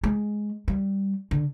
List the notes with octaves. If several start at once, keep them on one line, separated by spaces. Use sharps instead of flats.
G#3
G3
D3